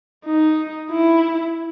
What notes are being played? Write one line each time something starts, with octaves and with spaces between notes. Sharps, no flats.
D#4
E4